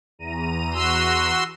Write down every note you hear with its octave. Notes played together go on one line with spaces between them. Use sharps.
E2 A#5 D#7
F#4 C6 E6